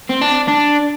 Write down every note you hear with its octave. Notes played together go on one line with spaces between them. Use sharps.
C4
D4
D4